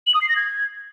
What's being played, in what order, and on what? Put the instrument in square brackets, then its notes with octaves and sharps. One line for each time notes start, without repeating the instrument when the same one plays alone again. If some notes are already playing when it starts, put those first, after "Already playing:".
[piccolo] F#7
D#6
C7
A#6
G#6